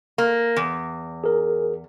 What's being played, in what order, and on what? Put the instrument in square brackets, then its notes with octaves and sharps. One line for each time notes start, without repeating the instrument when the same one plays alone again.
[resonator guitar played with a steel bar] A#3
E2
[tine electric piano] G#4 A#4